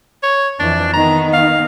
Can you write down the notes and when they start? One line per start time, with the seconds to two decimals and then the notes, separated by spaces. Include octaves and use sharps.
0.23 C#5
0.59 F2 E3 D4
0.93 D#3 B3 D#4 A#5
1.33 F5